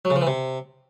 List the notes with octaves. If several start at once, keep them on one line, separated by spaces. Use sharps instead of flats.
F#3
C#3
F3
E3
C3